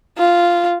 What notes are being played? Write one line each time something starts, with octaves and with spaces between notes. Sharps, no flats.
F4